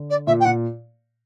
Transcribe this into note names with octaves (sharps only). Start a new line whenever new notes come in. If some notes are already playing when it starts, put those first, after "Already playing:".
Already playing: D3
D5
A#2 E5
G5
A#2 F#5